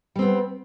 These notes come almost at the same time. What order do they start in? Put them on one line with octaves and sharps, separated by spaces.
G3 C4 B3